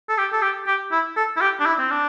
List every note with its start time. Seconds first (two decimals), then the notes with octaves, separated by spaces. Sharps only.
0.09 A4
0.18 G4
0.33 A4
0.42 G4
0.67 G4
0.92 E4
1.17 A4
1.37 E4
1.41 G4
1.60 D4
1.66 E4
1.79 C4
1.91 D4